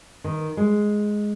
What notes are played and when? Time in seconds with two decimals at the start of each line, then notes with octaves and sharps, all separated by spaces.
0.24 D#3
0.57 G#3